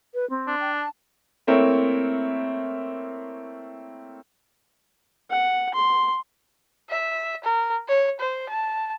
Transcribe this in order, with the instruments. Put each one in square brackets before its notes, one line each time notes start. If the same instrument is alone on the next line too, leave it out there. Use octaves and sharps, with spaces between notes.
[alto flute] B4
C4
[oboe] D4
[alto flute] G5
A5
[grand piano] A3 A#3 C4 E4 A#4 C#5
[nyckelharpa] F#5
C6
[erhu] E5
A#4
C#5
C5
A5